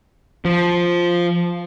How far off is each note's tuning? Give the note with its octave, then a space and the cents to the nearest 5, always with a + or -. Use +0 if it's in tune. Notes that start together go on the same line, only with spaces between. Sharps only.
F3 +0